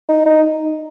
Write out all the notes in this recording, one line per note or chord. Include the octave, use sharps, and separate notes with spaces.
D#4
D#4